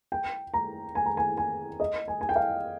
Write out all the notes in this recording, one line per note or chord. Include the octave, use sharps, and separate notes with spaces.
G5
A#5
G#5
A#5
G#5
G#5
D#5
G#5
G#5
G5
F5